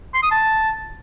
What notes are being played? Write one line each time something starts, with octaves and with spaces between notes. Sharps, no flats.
C6
D#6
A5